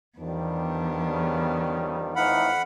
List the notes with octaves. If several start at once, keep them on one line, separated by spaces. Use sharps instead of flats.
E2 D#3 F3 G3 B3 D4
C#3
F2 A2 E3 D#4 F5 F#5 B5